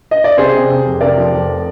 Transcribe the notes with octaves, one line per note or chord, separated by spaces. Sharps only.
D#5
D5
C3 G#4 C5
C3
C3
F1
C3 A#4 D5
F3
F1